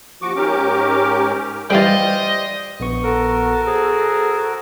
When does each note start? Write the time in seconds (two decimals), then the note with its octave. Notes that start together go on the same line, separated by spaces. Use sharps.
0.22 D#2 F3 F#4 C#6 D6
0.36 G#2 C#4 G4 A#4 D6
1.70 E3 G3 G4 C5 D5 D#5 F5 G5
2.80 A#1 B3 C#6
3.03 F#4 A4 A#4
3.67 G#4 C5